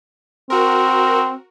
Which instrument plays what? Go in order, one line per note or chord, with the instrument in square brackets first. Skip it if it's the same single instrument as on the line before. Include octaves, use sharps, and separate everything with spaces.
[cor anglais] C4 [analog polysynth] F#4 A#4